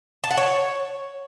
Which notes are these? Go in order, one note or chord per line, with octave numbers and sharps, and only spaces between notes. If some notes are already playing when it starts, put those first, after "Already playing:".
A5
F#5
C#5